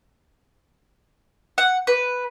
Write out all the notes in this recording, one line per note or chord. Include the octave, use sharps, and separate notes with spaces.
F#5
B4